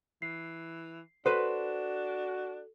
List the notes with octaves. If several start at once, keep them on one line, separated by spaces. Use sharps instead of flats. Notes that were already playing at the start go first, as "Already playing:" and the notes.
E3 C7
D4 F#4 A4 B4 C5